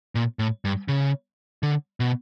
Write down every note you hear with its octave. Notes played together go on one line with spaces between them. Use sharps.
A#2
A2
G2
C#3
D3
B2